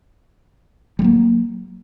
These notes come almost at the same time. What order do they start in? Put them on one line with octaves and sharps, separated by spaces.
G3 F#3 A#3